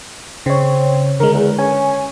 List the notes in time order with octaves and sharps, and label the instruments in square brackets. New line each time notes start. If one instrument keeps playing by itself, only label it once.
[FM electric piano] C#3 C#5 [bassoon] C4
[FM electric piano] D3 G#3 [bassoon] A#4
[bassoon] E2
[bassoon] C#4 [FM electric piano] G#5